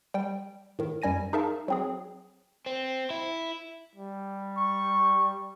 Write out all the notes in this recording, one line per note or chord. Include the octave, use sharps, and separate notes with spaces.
G3 G5
A2 D#3
F#2 G3 G#5 A#6 D#7
D#4 G#4 A#4 E5 F5 A5
F#3 C4 G#4
C4
E4
G3
C#6